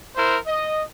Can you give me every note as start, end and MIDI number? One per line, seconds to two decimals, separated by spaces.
0.16 0.38 64
0.16 0.38 70
0.16 0.38 72
0.47 0.83 75